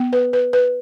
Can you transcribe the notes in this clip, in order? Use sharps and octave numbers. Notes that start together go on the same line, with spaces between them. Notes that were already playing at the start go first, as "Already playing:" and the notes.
Already playing: B3
B4
B4
B4